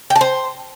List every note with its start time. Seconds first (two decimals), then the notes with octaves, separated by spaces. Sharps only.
0.10 G5
0.16 A5
0.21 C5